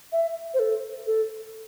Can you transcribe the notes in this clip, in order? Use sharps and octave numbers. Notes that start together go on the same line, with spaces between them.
E5
C5
A4
A4